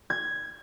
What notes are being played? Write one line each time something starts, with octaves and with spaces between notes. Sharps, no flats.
G#6